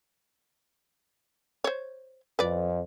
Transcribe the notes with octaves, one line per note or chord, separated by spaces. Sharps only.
C5 C#5
F2 B4 D5